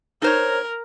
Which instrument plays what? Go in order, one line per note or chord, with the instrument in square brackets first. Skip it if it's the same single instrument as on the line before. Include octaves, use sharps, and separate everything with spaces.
[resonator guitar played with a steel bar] D#4 C5 C#5 [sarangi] A#4